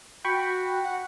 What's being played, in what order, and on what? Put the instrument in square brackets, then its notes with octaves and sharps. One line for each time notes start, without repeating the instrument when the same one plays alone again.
[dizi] F#4 [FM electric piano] G5 B5 C#6
[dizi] F#5